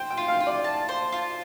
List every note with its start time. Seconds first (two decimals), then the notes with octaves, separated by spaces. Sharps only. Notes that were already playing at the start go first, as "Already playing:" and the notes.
Already playing: C5 G5
0.10 G5
0.17 F4
0.28 F5
0.40 F4
0.47 D5
0.64 A5
0.89 C5
1.12 F4